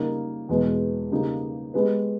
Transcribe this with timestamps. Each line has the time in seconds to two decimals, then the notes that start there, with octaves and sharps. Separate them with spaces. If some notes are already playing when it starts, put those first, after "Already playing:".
Already playing: C#3 G3 A#3 D#4 A#4
0.49 E2 B2 G#3 B3
1.12 C#3 G3 A#3 D#4 G4
1.74 G#3 B3 G4 B4